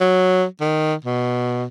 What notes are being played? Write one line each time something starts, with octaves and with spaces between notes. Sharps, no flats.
F#3
D#3
B2